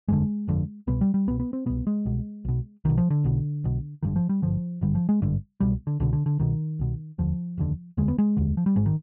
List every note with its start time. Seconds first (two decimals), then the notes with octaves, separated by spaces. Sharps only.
0.08 G1 F2 D3 G#3
0.47 G1 F2 D3
0.87 C2 B2 B3
1.01 G3
1.14 G3
1.27 C2 B2 B3
1.40 B3
1.53 C4
1.66 C2 B2 B3
1.87 G#3
2.05 C2 B2
2.45 B1 B2
2.85 B1 B2 D#3
2.98 F3
3.10 D3
3.24 B1 B2
3.64 B1 B2
4.03 G#1 G2 D3 D#3
4.16 F3
4.29 G3
4.42 G#1 G2 D3 F3
4.81 G#1 G2 D3 G3
4.95 F3
5.09 G#3
5.22 G#1 G2 D3
5.60 C2 B2 G3
5.87 D3
6.00 C2 B2 D3
6.13 D3
6.26 D3
6.39 C2 B2 D#3
6.79 C2 B2
7.18 F1 D#2 D3 F3
7.58 F1 D#2 D3
7.97 F1 D#2 D3 G#3
8.08 B3
8.18 G#3
8.37 F1 D#2 D3
8.57 F3
8.66 G3
8.76 G#1 G#2 G#3
8.86 D#3